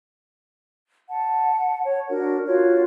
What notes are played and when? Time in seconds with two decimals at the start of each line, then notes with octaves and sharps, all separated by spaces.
1.09 F#5 A5
1.84 C#5
2.09 D4 F#4 A#4
2.46 F4 F#4 C#5